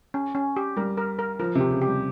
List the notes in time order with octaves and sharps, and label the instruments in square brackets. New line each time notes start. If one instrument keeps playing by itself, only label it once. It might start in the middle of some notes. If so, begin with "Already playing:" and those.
[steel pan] C#4
C#4
G4
[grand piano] G3 [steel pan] A#4
[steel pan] A#4
A#4
[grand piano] F3 [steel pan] A#4
[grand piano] C3
[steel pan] G4
[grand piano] C#3
[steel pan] G4
[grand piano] G3